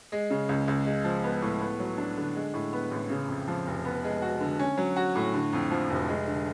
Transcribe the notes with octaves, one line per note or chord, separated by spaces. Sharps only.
G#3
C#3
C#2
C#2
G#3
F3
B3
A2
B3
F#3
D4
D3
G#3
A2
B3
A1
C#3
F2
F3
F1
B3
G#3
F#4
D3
C#4
F#3
F#4
A2
D3
F2
F3
F1
G#3
D3